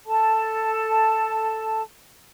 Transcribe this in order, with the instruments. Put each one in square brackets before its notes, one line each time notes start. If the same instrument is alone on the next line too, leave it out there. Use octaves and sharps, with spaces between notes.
[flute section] A4 A5